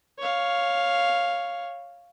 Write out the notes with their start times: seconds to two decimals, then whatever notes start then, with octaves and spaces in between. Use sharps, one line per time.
0.19 C#5 F5